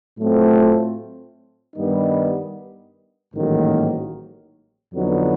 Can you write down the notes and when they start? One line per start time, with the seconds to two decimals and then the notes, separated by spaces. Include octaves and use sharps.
0.18 A2 F#3 A3 C4 F4
1.76 G2 D#3 G3 B3 D#4
3.35 A1 G#2 D#3 F#3 A#3
4.94 F2 D3 F#3 B3 D#4